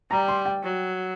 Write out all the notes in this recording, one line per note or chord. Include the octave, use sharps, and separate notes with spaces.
G3 A#5
C6
G5
F#3